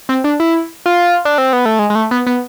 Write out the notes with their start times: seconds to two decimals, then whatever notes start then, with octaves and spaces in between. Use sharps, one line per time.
0.09 C4
0.24 D4
0.40 E4
0.86 F4
1.25 D4
1.38 C4
1.53 B3
1.66 A3
1.79 G#3
1.90 G#3
1.95 A3
2.11 B3
2.26 B3